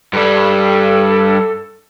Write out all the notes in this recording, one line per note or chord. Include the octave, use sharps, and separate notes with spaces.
G2 G3 A4